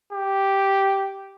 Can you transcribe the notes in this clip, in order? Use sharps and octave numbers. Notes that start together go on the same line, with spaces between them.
G4